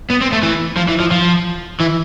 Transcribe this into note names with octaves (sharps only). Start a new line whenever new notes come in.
B3
C4
A3
E3
F3
E3
F3
F3
E3